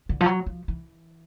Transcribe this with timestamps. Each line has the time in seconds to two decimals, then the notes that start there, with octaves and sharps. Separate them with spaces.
0.09 D3
0.21 F3
0.26 F#3
0.46 F3
0.68 E3